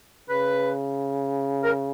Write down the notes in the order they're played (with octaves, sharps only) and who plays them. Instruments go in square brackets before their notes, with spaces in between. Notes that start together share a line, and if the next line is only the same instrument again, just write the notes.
[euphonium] C#3 [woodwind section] B4
[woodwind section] A#4